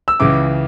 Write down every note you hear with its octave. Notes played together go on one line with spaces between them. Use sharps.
E6
C#2 C#3 E3 D6